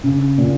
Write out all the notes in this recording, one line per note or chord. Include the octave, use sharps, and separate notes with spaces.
C#3
A#2